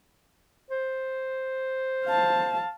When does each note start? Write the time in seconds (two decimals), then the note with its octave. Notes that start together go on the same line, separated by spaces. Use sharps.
0.71 C5
2.06 F5 A5